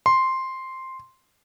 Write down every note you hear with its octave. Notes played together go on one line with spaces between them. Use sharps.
C6